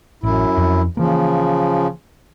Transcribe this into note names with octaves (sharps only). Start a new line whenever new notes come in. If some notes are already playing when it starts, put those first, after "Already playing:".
A1 F#2 E4
F2
C#3 E3 F3 A#3